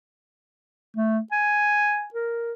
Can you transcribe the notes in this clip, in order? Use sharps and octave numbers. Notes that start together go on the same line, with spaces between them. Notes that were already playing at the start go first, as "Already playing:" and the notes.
A3
G#5
A#4